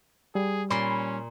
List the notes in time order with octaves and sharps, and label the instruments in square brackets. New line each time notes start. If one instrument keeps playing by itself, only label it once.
[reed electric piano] G3 [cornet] G#4
[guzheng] A#2 C6 [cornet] C#4 [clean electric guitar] B5